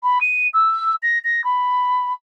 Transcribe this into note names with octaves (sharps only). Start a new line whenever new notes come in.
B5
D#7
E6
A#6
A#6
B5